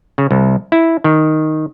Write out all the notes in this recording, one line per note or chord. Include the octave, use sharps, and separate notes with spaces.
C#3
C2
E4
D#3